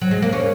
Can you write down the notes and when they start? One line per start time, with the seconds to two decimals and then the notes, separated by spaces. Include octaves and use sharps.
0.01 F#3
0.11 G#3
0.22 A#3
0.33 C#4